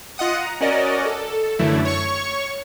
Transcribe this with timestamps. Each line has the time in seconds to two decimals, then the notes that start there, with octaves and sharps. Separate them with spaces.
0.18 F4 D#5 F#5 D#6
0.42 A#5
0.61 C#4 F#4 A#4 D5 D#5
1.05 A4
1.59 F#2 D3 E3 A3 E4
1.85 C#5 C#6